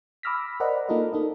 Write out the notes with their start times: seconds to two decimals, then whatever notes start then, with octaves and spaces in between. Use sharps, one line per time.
0.23 B5 D6 E6 F6 A#6 B6
0.60 A#4 C5 D5 D#5 F#5 B5
0.88 A#3 D#4 F4 A4 A#4 D#5
1.13 D#4 A4 D#5